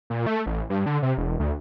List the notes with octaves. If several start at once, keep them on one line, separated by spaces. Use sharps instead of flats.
A#2
A3
A1
G2
D3
C3
E1
D2